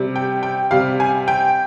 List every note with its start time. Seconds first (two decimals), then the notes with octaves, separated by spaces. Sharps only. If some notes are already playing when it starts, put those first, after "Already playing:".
Already playing: C3 G3
0.16 G5
0.43 G5
0.71 C3 G3 F5
1.00 G#5
1.28 G5